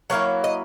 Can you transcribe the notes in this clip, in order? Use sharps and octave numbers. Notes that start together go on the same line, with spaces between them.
F#3 A#3 E4 C#5
D#5